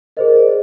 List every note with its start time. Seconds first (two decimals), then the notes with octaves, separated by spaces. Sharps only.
0.17 G#4 A#4 C5 D#5
0.36 D5